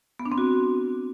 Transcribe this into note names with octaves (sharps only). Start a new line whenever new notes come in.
B3
D4
C4
F#4